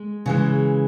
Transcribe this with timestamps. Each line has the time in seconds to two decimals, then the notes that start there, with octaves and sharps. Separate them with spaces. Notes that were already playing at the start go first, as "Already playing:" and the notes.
Already playing: G#3
0.26 C#3 E3 G#3